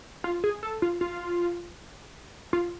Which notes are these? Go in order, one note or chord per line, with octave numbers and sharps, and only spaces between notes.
F4
G#4
A4
F4
F4
F4